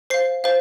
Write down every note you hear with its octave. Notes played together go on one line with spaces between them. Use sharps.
C5 F5 C7
C5 F5